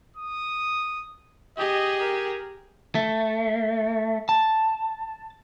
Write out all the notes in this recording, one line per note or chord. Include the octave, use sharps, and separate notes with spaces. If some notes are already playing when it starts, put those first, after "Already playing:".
D#6
G4 G#4 D#5
A#4
A3
A5